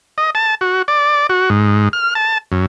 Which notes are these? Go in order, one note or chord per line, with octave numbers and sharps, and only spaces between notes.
D#5
A5
F#4
D5
F#4
G#2
F6
A5
F#2